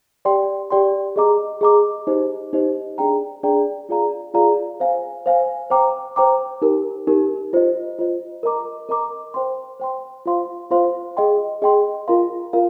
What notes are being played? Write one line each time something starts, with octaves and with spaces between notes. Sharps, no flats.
G4 D5 G5 C6
G4 D5 G5 C6
G#4 D#5 A#5 D6
G#4 D#5 A#5 D6
D#4 G4 C5 D#5
D#4 G4 C5 D#5
D4 G#4 D5 G5 A#5
D4 G#4 D5 G5 A#5
F4 G#4 D5 F5 A#5
F4 G#4 D5 F5 A#5
C5 F5 G#5
C5 F5 G#5
C5 G5 A#5 D6
C5 G5 A#5 D6
D#4 G4 A#4
D#4 G4 A#4
F4 C5 D#5
F4 C5 D#5
A#4 D#5 A#5 D6
A#4 D#5 A#5 D6
C5 G5 C6
C5 G5 C6
F4 C5 F5 C6
F4 C5 F5 C6
G#4 D#5 G5 C6
G#4 D#5 G5 C6
F4 A#4 F5 C6
F4 A#4 F5